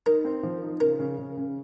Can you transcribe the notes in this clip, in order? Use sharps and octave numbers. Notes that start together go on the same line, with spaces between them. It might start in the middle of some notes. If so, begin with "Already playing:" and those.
D#4 A#4
C4
F3
D#4
C#3 A#4
C#3
C#3
C#3